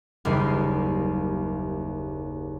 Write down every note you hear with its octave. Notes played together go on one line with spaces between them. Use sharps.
F#1 D#2 G3 B4 C7